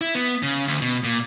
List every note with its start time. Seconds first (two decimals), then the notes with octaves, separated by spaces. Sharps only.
0.01 E4
0.15 B3
0.43 C#3
0.68 D2
0.82 B2
1.04 A#2